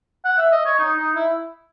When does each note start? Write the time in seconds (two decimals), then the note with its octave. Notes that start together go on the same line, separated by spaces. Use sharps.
0.25 F#5
0.38 E5
0.52 D#5
0.65 C#5
0.79 D#4
0.97 D#4
1.15 E4